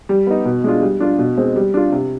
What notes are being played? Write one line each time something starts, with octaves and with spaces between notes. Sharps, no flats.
G3
B3 D#4
B2
G#3 D4 F4
G3
D4 F4
B2
G#3 C4
G3
D4 F4
C3